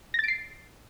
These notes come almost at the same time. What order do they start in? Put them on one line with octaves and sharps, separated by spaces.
A#6 A6 D7 C7